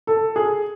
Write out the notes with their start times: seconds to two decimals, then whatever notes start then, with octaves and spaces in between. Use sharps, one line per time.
0.07 A4
0.36 G#4